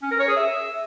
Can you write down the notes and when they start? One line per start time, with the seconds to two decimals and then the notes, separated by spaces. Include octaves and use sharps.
0.02 C#4
0.11 A#4
0.20 C#5
0.28 G#4
0.37 E5